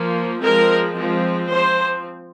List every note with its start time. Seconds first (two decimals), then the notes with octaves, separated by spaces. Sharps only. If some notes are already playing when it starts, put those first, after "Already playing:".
Already playing: F3 A#3
0.41 F3 G#3 C4 A#4
0.96 F3 G#3 C4
1.50 F3 C4 C5